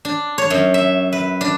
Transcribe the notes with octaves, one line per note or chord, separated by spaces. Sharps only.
D4
C#5
F#2
E5
B4
D4